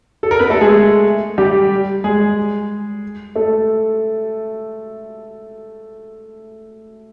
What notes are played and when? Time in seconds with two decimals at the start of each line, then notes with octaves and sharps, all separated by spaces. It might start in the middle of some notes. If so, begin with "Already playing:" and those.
0.23 A4
0.31 A#4
0.39 B3 B4
0.50 A3 A4
0.61 G#3 G#4
1.38 G3 G4
2.04 G#3 G#4
3.36 A3 A4